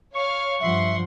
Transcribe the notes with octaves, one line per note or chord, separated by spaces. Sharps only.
C#5 F5 C#6
G2 F3 E5 F#5 C6